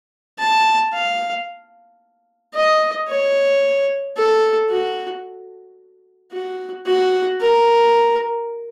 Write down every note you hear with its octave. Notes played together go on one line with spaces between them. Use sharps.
A5
F5
D#5
C#5
A4
F#4
F#4
F#4
A#4